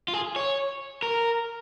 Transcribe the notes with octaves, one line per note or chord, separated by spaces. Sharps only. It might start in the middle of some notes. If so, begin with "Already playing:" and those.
F4
G#4
C#5
A#4